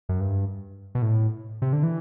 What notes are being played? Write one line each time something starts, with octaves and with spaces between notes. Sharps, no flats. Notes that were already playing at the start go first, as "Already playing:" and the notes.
F#2
G2
B2
A2
C3
D3
E3